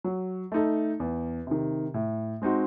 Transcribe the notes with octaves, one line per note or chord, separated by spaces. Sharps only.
F#3
A3 D#4 A4
E2
C3 D#3
A2
G#3 C4 D#4 F#4